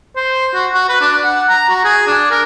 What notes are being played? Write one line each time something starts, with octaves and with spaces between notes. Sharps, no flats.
C5
F#4
F#4
B4
D4
F#5
A#5
F#4
G#4
D4
A#4